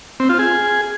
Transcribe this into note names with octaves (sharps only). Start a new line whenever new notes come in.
C4
F4
G#4